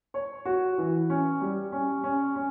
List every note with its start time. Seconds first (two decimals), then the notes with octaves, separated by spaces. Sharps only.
0.14 C#5
0.45 F#4
0.78 E3
1.10 C#4
1.41 G3
1.72 C#4
2.04 C#4
2.36 C#4